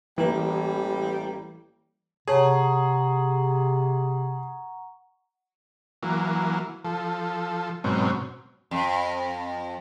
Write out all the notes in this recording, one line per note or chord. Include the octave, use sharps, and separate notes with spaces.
A1 E3 G3 A#3
C3 G#4 C#5 F#5 A5 A#5 C#6
E3 F#3 A#3
F3 A4
G#2 B2 F#3 C4 C#4
F2